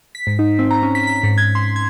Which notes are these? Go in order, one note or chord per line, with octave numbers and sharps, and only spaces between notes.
B6
G#2
D#4
C4
A#5
C#4
B6
B6
G#2
G#6
C6
G#6